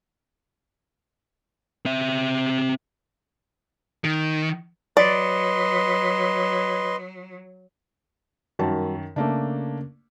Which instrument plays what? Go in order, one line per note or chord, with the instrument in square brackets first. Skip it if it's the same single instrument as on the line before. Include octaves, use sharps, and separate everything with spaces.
[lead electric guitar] C4 E5
D#3
[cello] F#3 [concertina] B4 D#5 C6 [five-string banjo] D5
[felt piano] F#2 D#3 A5 [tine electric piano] G3 F#4 A#4
[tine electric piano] C#3 C#4 [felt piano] A3 A#3 D4